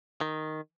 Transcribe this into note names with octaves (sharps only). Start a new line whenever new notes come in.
D#3